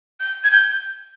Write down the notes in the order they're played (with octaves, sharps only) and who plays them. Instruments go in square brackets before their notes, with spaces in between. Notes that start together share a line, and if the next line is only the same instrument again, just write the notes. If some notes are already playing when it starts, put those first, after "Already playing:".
[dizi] G6
G#6
G6